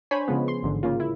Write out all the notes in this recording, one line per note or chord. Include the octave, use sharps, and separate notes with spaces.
D4 C5 C#5 G#5 B5
C#3 F3 G#3 B3
C6
A1 G#2 D3
C#3 A#3 F4
E4